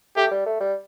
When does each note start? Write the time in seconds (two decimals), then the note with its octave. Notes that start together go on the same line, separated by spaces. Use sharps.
0.16 A3 G4
0.31 G3
0.46 A3
0.60 G3